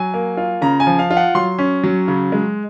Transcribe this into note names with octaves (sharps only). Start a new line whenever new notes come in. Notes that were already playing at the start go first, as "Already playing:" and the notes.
Already playing: F#3 G#5
A#3
F4
C#3 A#5
G#5
F3
F5
F4
F#5
F#3 C6
C#4
F#3
C#3
G#3